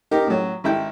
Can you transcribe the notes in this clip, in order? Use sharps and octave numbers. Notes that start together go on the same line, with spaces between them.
D#4 G4 A#4
A2 F#3
G#1 E4 G5